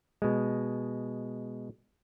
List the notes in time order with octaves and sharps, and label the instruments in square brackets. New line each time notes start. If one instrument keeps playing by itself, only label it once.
[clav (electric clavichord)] B2 G#3